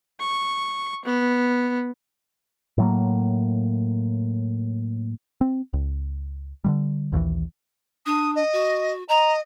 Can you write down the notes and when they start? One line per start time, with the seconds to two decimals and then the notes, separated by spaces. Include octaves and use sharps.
0.20 C#6
1.05 B3
2.78 A2 F#3 A#3
5.41 C4
5.73 C#2
6.64 D3 D#3 G3
7.12 A#1 D#2 D3 E3
8.06 D4 D#6
8.36 D#5
8.53 F#4
9.09 D#5 A#5